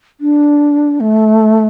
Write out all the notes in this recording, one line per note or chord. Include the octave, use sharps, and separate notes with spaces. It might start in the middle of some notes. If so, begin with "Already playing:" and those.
D4
A3